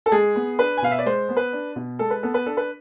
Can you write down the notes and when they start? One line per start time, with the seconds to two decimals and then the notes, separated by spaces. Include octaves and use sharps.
0.06 A4
0.12 G#3 G#4
0.35 B3
0.59 D4 B4
0.77 G#5
0.82 B2 F5
0.91 E5
0.98 D5
1.05 G#3 C5
1.29 B3
1.37 B4
1.53 D4
1.76 B2
1.99 G#3 A4
2.10 B4
2.23 B3 A4
2.34 B4
2.46 D4 A4
2.57 B4